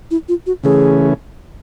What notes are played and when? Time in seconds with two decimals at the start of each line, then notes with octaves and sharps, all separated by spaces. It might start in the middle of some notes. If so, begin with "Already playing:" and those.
0.11 E4
0.29 F4
0.46 F#4
0.64 C#3 E3 A3 C#4 G#4